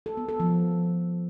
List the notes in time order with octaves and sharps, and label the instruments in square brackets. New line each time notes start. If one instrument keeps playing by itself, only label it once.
[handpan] A4
B3
A4
F3